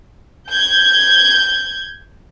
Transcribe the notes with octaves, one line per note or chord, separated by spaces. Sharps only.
G6 G#6